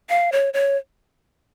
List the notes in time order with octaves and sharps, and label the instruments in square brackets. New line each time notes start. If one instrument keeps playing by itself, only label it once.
[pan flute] F5
C#5
C#5